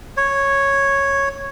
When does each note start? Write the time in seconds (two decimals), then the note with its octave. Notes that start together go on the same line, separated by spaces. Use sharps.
0.17 C#5